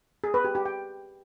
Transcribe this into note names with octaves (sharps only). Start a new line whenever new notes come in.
G#4
B4
G4
G4
G5